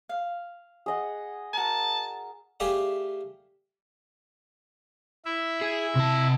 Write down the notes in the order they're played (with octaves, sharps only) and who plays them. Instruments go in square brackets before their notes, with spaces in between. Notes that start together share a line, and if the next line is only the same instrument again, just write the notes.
[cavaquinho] F5
[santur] G#4 D#5 F#5
[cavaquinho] F#4 A#4 [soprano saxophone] A5
[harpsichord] A3 G4 G#4 D5 E5 F5
[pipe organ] E4 E5
[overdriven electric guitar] G#4
C3 A5